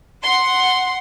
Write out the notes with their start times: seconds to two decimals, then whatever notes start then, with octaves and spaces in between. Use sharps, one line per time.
0.23 F#5 C6